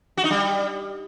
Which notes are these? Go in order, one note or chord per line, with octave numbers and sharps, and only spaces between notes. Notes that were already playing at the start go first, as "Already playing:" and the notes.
F#4
D#4
G3